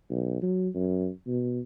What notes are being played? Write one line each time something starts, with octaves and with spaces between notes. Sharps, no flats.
B1
F#3
F#2
B2